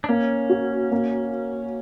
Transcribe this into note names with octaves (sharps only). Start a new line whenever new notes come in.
D4
A#3 C#4
F#4
A#3